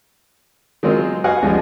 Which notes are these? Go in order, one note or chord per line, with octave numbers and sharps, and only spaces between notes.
D#3 F#3 G#3 C4 F4
F#4 B4 D#5 F5 F#5 G#5
C#2 F3 G3 G#3